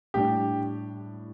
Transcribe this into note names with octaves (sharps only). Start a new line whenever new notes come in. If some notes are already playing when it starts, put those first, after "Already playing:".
A2 G3 D4 G4